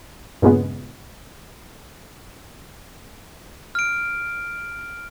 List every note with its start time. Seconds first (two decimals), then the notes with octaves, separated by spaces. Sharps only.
0.42 G2 A#2 C#3 G#3 B3
3.75 F6 D7